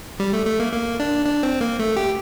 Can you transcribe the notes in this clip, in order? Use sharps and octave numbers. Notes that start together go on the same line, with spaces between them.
G3
A3
A3
A#3
A#3
D4
D4
C4
A#3
A3
G4